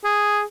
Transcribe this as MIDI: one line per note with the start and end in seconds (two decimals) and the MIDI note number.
0.04 0.41 68